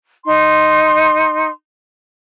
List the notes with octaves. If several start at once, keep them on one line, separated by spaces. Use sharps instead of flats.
D#4 C6